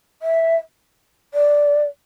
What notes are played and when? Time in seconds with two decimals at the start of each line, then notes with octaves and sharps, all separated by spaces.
0.22 E5
1.34 D5